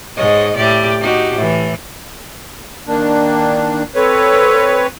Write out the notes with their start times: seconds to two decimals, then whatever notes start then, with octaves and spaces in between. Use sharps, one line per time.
0.16 G#2 C#5 D#5
0.56 A2 G4 D5
1.01 D#4 F#4 G4
1.36 A2 E3
2.87 D#3 A#3 D4
3.95 C4 A4 B4 C#5